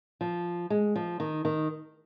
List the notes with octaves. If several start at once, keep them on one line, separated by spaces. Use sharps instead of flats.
F3
G#3
F3
D#3
D#3